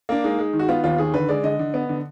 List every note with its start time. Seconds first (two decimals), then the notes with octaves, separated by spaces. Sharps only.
0.09 A#3 D4
0.24 G#3 D#4
0.39 G#3
0.53 D#3
0.59 F#4
0.69 B3 F4
0.84 D#2 F4
0.98 D#3 G#4
1.14 D3 B4
1.29 G#3 D5
1.43 D3 D#5
1.59 D3
1.74 B3
1.89 D3